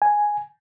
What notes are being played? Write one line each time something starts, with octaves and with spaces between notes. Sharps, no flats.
G#5